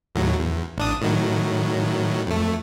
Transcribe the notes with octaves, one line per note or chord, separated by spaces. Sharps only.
D#2 A2 F#3
E2
A1 D4 D#6
A2 D#3 F#3
F2 A3